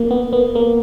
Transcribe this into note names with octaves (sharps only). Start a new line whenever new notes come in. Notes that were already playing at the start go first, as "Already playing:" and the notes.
Already playing: A#3
B3
B3
A#3